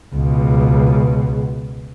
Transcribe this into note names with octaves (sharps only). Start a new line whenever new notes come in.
C#2 B2